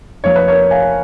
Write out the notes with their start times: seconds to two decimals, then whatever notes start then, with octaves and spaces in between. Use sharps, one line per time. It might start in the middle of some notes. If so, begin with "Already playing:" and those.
0.24 F1 F2 F3 A#3 C#5
0.36 B4
0.48 A#4 C#5
0.71 F5 G#5